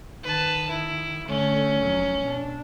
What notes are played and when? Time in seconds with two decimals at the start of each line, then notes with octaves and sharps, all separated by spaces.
0.23 D#3 B4 A5
0.70 E4
1.28 D3 A3 C#4
1.81 F1 F#3
2.21 B2 D4